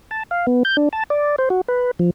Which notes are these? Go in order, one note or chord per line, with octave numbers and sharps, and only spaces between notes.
A5
F5
B3
G6
D4
A5
D5
C5
F#4
B4
F3